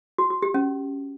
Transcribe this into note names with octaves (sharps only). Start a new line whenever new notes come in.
F#4
F#4
G4
C#4